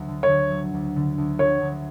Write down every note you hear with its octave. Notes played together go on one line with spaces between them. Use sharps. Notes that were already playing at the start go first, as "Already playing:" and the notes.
Already playing: D2 F#3
D3
C#5
D2
F#3
D2
D3
D2
F#3 C#5
D2